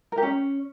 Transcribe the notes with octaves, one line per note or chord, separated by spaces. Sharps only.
A#4
G4
C#4